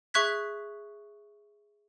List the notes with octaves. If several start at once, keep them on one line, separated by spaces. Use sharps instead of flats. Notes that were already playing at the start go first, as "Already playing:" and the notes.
G#4 E5 C#6 F#6 G#6 B6